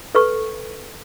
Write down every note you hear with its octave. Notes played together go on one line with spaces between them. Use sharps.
A4 B4 C#6